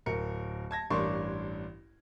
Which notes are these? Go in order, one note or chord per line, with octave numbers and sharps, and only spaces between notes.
D1 A#4 C#7
A5 G#6 A#6
A1 G2 D4 A#4 C6 C#6